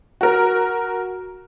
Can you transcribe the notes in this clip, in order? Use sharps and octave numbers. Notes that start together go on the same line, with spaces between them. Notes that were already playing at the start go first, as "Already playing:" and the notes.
F#4 A#4